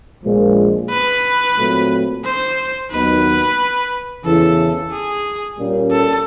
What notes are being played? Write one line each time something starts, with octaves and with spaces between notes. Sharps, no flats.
A#1 A#2 F3 G#3
B4
A#2 F#3 A3 C4
C5
D#2 D#3 F#3 B3 D#4 B4
E2 C#3 E3 A4
G#4
A#2 G3 A#3 C#4
A4